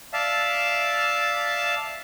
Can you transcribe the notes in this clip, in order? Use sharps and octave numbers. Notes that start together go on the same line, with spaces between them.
D5 E5 F5 A5